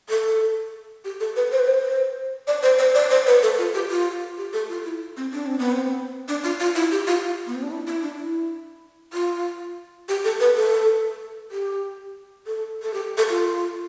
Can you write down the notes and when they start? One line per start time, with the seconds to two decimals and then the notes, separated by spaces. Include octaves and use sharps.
0.09 A4
1.05 G4
1.20 A4
1.36 B4
1.52 C5
1.60 B4
1.68 C5
2.47 D5
2.63 C5
2.79 C5
2.95 D5
3.11 C5
3.27 B4
3.42 A4
3.58 F4
3.74 G4
3.90 F4
4.38 G4
4.53 A4
4.69 F4
4.85 E4
5.17 C4
5.33 D4
5.46 C4
5.59 B3
5.72 C4
6.28 D4
6.44 F4
6.60 F4
6.75 E4
6.91 G4
7.07 F4
7.47 B3
7.55 C4
7.63 D4
7.71 E4
7.87 E4
8.02 D4
8.18 E4
9.13 F4
10.09 G4
10.24 A4
10.40 B4
10.56 A4
11.51 G4
12.47 A4
12.82 A4
12.94 G4
13.17 A4
13.30 F4